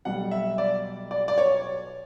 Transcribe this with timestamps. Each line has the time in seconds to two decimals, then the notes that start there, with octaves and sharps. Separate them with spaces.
0.05 B1 B2 G3 F#5
0.31 E5
0.58 D5
1.11 D5
1.28 D5
1.38 C#5